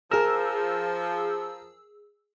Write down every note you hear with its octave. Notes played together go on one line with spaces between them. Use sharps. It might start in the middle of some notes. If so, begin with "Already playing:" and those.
F3 G#4 A#4 E6